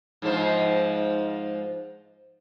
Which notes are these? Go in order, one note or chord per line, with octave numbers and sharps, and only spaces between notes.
G#2 F3 C5